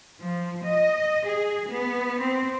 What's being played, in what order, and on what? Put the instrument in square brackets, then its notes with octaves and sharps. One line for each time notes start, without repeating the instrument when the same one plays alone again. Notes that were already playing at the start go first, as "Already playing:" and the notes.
[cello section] F3
D#5
G#4
B3
C4